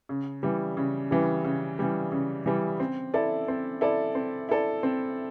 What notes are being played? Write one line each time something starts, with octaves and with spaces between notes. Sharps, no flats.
C#3
E3 G3
C#3
E3 G3
C#3
E3 G3
C#3
E3 G3
C4
E4 A4 D5
C4
E4 A4 D5
C4
E4 A4 D5
C4